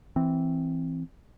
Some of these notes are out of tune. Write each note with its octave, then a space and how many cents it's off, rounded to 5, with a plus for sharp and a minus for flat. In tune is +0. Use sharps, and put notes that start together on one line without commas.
E3 +0 C4 +0